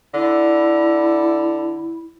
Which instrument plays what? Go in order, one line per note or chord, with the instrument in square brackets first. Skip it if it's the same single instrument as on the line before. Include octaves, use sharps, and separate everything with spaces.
[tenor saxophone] D3 [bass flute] E4